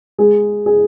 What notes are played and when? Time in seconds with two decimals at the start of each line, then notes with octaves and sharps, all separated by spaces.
0.18 G#3 G#4
0.66 G#4